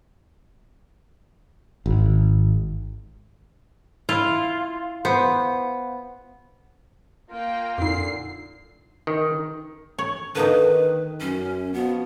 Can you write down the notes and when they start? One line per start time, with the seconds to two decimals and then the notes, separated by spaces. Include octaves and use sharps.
1.86 G#1
4.09 E4 F4
5.05 B3 C5
7.30 A#3 F4 G5
7.78 F2 A#2 D3 D#4 C7
9.07 D#3
9.99 C#5
10.35 D3 D#3 A#3 D#4 B4
11.20 F#2 C#4
11.74 B2 F3 B3 F#4